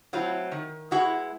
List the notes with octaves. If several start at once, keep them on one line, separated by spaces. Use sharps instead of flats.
F#3 A3 C4 E4 F4
D#3
G#3 B3 E4 F#4